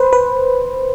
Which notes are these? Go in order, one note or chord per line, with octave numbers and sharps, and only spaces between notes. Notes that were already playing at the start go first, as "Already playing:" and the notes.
Already playing: B4 C5
B4